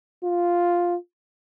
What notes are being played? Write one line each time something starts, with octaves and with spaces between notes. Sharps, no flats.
F4